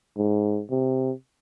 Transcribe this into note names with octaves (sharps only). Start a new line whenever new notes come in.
G#2
C3